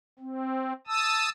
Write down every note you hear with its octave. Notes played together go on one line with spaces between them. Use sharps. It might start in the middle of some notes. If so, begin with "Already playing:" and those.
C4
A5 D#6 E6